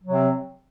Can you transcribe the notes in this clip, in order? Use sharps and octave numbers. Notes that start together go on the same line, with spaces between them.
C3 F#3 C4